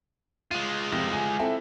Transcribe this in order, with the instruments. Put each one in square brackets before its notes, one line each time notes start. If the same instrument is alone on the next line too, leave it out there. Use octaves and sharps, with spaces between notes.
[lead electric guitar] G#3 F4 [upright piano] D#7
[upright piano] F2 C3 A#6
G#5
C4 E4 A4